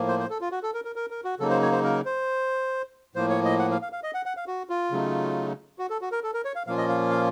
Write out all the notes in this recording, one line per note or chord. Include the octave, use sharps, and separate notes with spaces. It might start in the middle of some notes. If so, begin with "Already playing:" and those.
Already playing: A2 F3 A#3
C5
C5
A4
F4
F#4
A4
A#4
A#4
A#4
A#4
F#4
C#3 F#3 A#3 D#4 A4
C5
C#5
C5
A#4
C5
A2 F3 A#3 C5
C#5
D#5
F#5
F5
F5
F5
D#5
F#5
F#5
F5
F#4
F4
C#3 F#3 A3 D#4
F#4
A4
F#4
A#4
A4
A#4
C#5
F5
A#2 F3 A#3 C#4 F4 F5
D#5
F5
F5